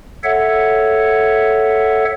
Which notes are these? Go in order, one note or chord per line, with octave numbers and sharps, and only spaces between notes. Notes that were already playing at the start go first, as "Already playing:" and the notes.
A4 C#5 E5 F#5